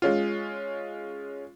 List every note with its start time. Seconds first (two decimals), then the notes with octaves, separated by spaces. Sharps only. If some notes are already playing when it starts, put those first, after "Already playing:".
0.02 G#3 C#4 F4